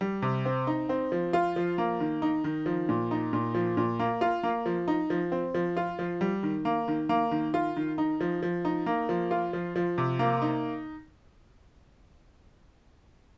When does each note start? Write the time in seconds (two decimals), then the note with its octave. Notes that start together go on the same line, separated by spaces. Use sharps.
0.01 G3
0.22 C3
0.45 C4
0.67 D#4
0.89 C4
1.12 F3
1.33 F4
1.56 F3
1.78 A#3
2.00 D#3
2.22 D#4
2.44 D#3
2.66 F3
2.89 A#2
3.11 D#4
3.33 A#2
3.54 F3
3.77 A#2
3.99 A#3
4.21 F4
4.43 A#3
4.66 F3
4.88 D#4
5.10 F3
5.32 C4
5.54 F3
5.77 F4
5.99 F3
6.21 G3
6.43 D#3
6.65 A#3
6.88 D#3
7.09 A#3
7.31 D#3
7.54 F4
7.76 D#3
7.98 D#4
8.21 F3
8.42 F3
8.65 D#4
8.86 A#3
9.09 F3
9.31 F4
9.53 F3
9.76 F3
9.98 C3
10.19 A#3
10.42 D#4